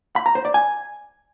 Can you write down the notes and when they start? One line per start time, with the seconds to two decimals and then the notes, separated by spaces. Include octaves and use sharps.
0.16 B5
0.26 A#5
0.35 C5
0.45 D5
0.54 G#5